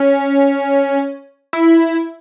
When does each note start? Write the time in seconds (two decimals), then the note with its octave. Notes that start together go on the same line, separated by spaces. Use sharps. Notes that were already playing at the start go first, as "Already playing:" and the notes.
Already playing: C#4
1.53 E4